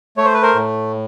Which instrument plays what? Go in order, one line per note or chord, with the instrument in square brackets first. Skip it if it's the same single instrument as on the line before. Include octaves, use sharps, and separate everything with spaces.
[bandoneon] A3 C#5
C5
B4
A#4 C5
A2